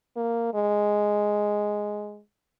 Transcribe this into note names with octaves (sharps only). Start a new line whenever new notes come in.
A#3
G#3